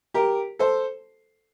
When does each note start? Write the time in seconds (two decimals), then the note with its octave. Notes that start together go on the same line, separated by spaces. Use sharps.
0.14 G4 A#4
0.59 A4 C5